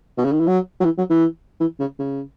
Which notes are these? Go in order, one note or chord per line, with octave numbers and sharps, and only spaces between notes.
B2
C#3
D#3
E3
F#3
F#3
E3
F#3
E3
E3
C#3
C#3